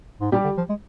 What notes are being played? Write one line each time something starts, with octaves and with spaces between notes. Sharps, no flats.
G#2
A#2 G3 G4
D3
F3
G#3